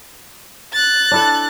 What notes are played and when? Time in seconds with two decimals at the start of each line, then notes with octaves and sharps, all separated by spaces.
0.73 F#6 A6
1.11 D4 E4 A4